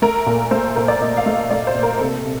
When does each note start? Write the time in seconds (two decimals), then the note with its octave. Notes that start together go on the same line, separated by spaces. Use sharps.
0.02 A3 A#4
0.26 A#2
0.51 A3 C5
0.76 A#2 A#4
0.88 D5
1.01 A#2 D#5
1.17 F5
1.26 A3
1.34 D#5
1.51 A3 D5
1.67 C5
1.75 A#2
1.83 A#4
1.99 C3 A4
2.24 C3